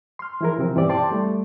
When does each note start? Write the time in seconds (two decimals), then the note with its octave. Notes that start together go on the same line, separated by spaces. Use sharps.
0.19 C6 F6
0.41 E3 F3 E4 G#4 A#4
0.59 C3 E3 F3 C4
0.75 G2 B2 E3 C4 G4 D5
0.89 D5 G5 A5 C6 D6
1.11 G3 A3